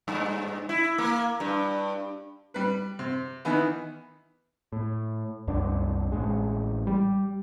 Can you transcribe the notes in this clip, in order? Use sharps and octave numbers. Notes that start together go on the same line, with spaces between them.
G2
E4
A#3
G2
G3 B4
C3
D#3 E3 B3
A2
C2 F#2 D4
A1 G#3
G3